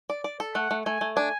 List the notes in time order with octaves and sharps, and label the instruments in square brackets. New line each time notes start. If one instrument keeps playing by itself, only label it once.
[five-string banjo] D5
D5
A4
[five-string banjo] A3 [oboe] F#5
[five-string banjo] A3
[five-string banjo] A3 [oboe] G#5
[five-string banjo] A3
[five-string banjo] D4 [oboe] G#5